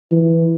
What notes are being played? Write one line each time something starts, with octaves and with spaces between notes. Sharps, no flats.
E3